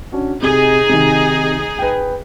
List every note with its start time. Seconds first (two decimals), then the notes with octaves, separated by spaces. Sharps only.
0.12 C#4 D4 F#4
0.43 C3 D#4 G#4
0.89 C3 D#3
1.79 B4 G5